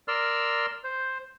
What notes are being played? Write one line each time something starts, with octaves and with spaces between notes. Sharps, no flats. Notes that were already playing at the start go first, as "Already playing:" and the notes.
A#4 D5 C6 E6 F6
C5